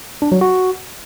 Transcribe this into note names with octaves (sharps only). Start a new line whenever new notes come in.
D4
F#3
F#4